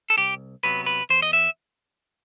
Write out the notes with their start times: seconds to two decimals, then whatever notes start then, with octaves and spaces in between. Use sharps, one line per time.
0.10 A4
0.17 C2 G4
0.63 C3 F#3 B3 B4
0.86 B4
1.10 E2 C5
1.22 D#5
1.33 E5